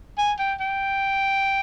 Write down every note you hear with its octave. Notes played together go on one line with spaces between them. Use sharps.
G#5
G5
G5